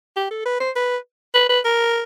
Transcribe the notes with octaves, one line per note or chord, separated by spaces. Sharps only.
G4
A4
B4
C5
B4
B4
B4
A#4